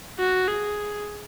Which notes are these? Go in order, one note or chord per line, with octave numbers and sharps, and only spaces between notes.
F#4
G#4